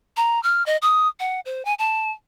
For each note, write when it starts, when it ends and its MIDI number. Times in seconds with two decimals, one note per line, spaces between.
0.17 0.42 82
0.43 0.65 89
0.66 0.77 75
0.82 1.08 87
1.20 1.40 78
1.45 1.65 72
1.65 1.74 80
1.79 2.11 81